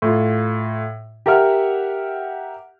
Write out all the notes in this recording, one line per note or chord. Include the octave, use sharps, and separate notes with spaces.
A2 F4
G4 A#4 E5 F#5 F6